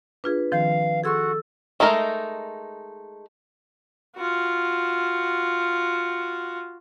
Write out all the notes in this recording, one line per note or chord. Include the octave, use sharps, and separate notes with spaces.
D4 F4 G#4 B4
D#3 F3 C4 F5
F#4 G#4 A4 C6 C#6 E6
G#3 A3 D#4 A#4
F4 F#4